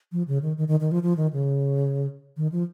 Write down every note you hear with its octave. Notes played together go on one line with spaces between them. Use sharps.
F3
C#3
D#3
D#3
D#3
D#3
F3
F3
D#3
C#3
D#3
F3